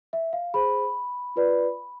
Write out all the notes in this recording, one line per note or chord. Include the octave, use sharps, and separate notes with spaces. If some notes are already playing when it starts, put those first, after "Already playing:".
E5
F5
G#4 C5 B5
F4 B4 D5